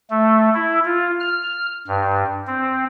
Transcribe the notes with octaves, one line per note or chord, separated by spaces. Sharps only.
A3
E4
F4
F6
G2
C4